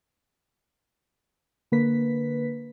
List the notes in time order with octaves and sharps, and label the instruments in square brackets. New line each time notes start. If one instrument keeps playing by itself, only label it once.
[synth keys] D3 A#3 B4 B6